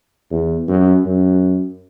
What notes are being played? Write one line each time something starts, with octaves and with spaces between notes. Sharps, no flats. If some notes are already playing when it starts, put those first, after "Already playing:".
E2
F#2
F#2